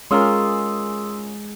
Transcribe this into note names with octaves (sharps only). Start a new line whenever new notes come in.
G#3 C#4 F4 G#4 A#4 C6 D#6 E6